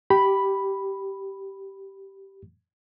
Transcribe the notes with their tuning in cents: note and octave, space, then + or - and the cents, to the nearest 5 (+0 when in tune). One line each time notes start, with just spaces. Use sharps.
G4 -10 B5 +0